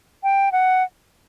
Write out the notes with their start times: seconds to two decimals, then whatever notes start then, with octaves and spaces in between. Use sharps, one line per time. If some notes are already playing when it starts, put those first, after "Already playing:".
0.23 G5
0.52 F#5